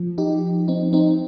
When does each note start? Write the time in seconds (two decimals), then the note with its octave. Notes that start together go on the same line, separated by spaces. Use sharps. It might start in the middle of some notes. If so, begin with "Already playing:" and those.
Already playing: F3
0.18 D#4 G4
0.68 C4 D#4
0.93 C4 D#4